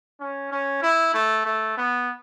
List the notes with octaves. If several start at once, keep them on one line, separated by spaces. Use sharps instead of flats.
C#4
C#4
E4
A3
A3
B3